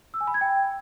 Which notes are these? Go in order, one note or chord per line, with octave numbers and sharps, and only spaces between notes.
E6
G#5
B5
G#6
G5